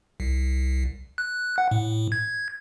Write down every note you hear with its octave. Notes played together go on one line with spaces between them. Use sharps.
C2
F#6
F#5
A2
G#6